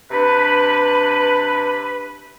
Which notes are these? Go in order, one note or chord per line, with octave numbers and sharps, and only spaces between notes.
C3 D4 B4